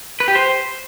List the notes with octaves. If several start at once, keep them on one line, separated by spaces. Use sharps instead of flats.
B4
G4
C5